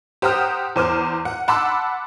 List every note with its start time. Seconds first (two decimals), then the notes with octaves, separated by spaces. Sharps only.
0.22 G4 C5 F#5 A#5 D#6 F6
0.76 E2 C5 D6 F6
1.25 F#5
1.48 F#5 A5 B5 C6 D6 E6